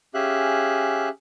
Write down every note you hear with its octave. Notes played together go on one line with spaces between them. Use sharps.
C#4 G4 G#4 E5 F5 F#6